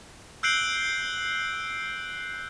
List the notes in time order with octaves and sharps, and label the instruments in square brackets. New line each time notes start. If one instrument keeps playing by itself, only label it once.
[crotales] E6 F#6 G6 C7 D7 F#7